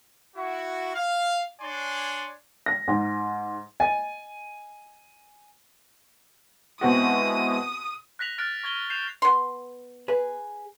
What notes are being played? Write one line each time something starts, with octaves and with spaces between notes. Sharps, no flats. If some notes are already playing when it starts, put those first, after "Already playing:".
E4 F#4
F5
D4 C#5 D5 G#5 C6
A#6
G#2
D#5 G#5
B2 G#3 C4 E4 F#4 D#6
F#6 A#6 B6 F7 F#7
F6 F#6 A6 D7
C#6 G#6 G7
G6 C7 E7 F7
B3 C6
G#4 B4